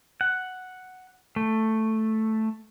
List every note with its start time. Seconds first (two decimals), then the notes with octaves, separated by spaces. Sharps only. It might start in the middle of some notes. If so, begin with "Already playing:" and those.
0.21 F#5
1.36 A3